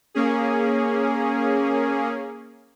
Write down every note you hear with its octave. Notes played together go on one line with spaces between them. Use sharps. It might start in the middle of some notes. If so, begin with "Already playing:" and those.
A#3 C#4 G#4